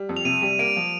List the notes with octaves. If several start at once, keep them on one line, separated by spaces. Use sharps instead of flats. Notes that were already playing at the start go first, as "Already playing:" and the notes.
Already playing: G3
F2
F7
C3 D#7
G3
A#3 D7
F3